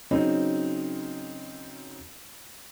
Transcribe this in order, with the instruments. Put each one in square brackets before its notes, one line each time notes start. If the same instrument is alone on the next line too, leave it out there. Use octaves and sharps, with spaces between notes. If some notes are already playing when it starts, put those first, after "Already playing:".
[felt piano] C#3 F#3 C4 D#4